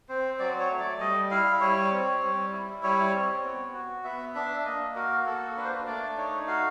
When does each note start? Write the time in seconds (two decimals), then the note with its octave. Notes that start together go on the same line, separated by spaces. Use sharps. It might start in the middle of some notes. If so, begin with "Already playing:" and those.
0.09 C4 C5
0.39 F#3 D5
0.60 C#5
0.70 A3
0.80 D5
1.00 G3 D#5
1.31 E4 F5
1.61 G3 C#5
1.92 C4
2.22 G3
2.52 E4
2.83 G3 C#5
3.13 C4
3.44 B3
3.74 F#4
4.04 B3 E5
4.35 D4 E5
4.65 A#3 D#5
4.95 F#4 A#4
5.26 A#3 A4
5.57 D4 B4
5.64 C5
5.72 B4
5.87 A3 D5
6.18 D#4 C#5
6.48 F#4 F5